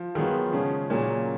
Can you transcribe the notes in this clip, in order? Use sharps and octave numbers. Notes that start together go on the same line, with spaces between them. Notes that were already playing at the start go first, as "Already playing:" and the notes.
Already playing: F3
D#3 F#3 B3 F4 G#4
C#3 F3 G#3 C#4 G#4
A#2 F#3 A#3 C#4 G#4